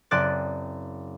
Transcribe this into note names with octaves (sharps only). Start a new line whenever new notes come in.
F#1 C4 D5 F#6 A6